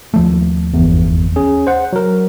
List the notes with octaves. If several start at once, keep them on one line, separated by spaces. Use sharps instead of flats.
D#2 F3 A3
G1 E2
C#4 G#4
C5 F#5
F#3 A#4